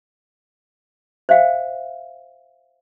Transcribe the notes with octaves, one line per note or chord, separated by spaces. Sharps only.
C5 E5 F5 G5